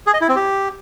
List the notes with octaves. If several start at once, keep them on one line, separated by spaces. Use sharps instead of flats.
G#4
D#5
E4
C4
G4